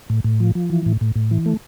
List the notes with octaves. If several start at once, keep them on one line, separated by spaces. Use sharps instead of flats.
A2
A2
F3
F3
E3
A2
A2
A2
E3
A3